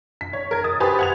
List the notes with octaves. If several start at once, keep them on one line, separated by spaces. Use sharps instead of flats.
B6
C#5
A#4 G#6
D#6 A6
G4 B4 C5 G#5 B5
F#5 G#6 F7